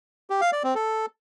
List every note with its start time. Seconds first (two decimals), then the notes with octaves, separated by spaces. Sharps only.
0.30 G4
0.41 F5
0.52 D5
0.64 C4
0.75 A4